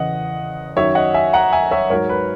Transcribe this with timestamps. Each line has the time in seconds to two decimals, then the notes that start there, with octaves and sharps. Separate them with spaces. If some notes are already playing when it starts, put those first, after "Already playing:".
Already playing: E2 C#3 E3 D#5 F#5
0.76 F#2 D#3 F#3 C#5 E5
0.95 D#5 F#5
1.14 E5 G#5
1.33 F#5 A#5
1.52 E5 G#5
1.71 C#5 E5
1.90 G#2 F#3 A#4 C#5
2.09 B4